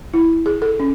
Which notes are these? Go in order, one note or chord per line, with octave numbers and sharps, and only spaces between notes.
E4
G#4
A4
C#4